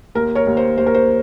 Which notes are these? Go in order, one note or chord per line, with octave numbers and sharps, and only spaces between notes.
D#2 A#4
A#4 C#5
D#2
C5
D#2 C5
A#4
C5